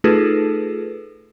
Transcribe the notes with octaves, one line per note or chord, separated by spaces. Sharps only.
A3 D#4 F4 G#4 A4 B4